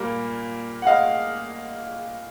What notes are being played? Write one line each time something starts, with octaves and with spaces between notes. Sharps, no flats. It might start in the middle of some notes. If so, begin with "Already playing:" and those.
Already playing: A#2 G3 A#3
F#5
D#5 F5